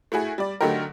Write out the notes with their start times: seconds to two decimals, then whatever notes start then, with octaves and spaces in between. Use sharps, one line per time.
0.12 A3 E4 F#4 G#4
0.38 G3 D5
0.61 D3 F#3 A3 D#4 G4 A#4